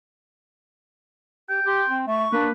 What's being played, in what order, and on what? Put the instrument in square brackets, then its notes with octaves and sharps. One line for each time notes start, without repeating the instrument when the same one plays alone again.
[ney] G4 [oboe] G5
[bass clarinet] G4 [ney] C6
[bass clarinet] C4
[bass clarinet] A3 [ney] C#6
[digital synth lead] A#3 [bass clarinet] D4 [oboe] B4